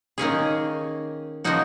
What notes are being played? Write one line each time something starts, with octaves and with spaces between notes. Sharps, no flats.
D#3 A#3 C#4 G#4
C#3 F3 A#3 D#4 F#4